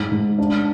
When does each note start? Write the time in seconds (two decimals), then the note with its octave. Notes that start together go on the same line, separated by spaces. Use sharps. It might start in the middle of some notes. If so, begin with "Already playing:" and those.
Already playing: G#2
0.12 G#2
0.38 D4